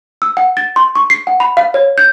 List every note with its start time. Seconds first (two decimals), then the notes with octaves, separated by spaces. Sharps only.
0.22 E6
0.37 F#5
0.57 A6
0.76 C6
0.96 C#6
1.10 C7
1.27 F#5
1.40 B5
1.57 F5
1.74 C#5
1.98 G6